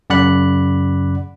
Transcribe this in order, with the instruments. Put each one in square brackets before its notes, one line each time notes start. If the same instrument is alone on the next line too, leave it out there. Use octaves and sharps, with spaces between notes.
[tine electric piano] F#2 C#3 D5 F#5 B5 F#6